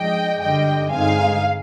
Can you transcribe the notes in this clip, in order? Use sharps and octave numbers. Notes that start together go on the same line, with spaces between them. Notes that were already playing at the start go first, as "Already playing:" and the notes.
Already playing: G#2 F3 G#3 D4 D#5 G5
G2 D3 G3 D4 D#5 G5
G2 D3 G#3 C4 D#4 F5 G#5